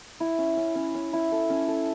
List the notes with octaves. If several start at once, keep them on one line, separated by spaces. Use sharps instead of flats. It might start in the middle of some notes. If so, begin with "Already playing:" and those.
E4
C#4
C#4
C#4
C#4
E4
A4
C#4
A4